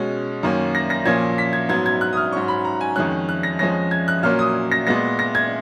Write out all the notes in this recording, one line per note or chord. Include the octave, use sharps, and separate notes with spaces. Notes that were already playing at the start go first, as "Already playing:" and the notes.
Already playing: B2 G#3 C#4
F#2 D#3 A#3 C#4
A#6
A#6
A#2 F3 A#3 C#4 G#6
B6
G#6
G#2 F#3 B3 G#6
G#6
F#6
D#6
F6
G#2 F#3 C#4 C#6
B5
A#5
G#5
F2 D#3 G#3 C#4 F#6
F#6
A#6
F2 F3 G#3 C#4 A#6
G#6
F#6
A#2 F#3 A#3 C#4 F6
D#6
A#6
A#2 G#3 B3 A#6
A#6
G#6